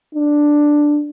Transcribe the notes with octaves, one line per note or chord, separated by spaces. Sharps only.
D4